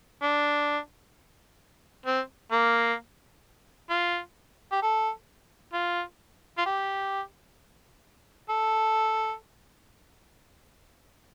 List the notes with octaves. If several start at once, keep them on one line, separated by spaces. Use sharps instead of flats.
D4
C4
A#3
F4
G4
A4
F4
F4
G4
A4